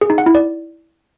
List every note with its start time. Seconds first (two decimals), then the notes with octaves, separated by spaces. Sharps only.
0.01 G#4
0.10 D#4
0.18 F#5
0.26 E4
0.35 D5